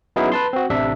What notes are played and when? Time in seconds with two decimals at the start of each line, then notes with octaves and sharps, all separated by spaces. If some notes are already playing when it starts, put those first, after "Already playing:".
0.16 F#3 B3 C#4 D#4 E4 G#4
0.32 B4 A5 C6
0.53 C4 F#4
0.70 A1 C3 D4 E5